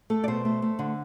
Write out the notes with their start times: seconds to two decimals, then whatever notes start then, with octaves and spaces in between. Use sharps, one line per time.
0.10 A3 A4
0.24 D5
0.28 B2 C5
0.45 A3
0.62 A3
0.79 D3